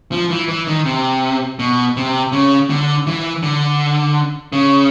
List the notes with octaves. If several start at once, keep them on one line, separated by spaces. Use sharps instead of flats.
F3
E3
E3
D#3
C3
B2
C3
C#3
D3
E3
D3
C#3